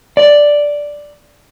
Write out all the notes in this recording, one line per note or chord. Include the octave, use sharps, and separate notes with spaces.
D5